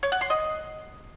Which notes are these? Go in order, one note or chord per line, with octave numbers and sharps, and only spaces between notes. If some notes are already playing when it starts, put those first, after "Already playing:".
C#5
F#5
C6
D#5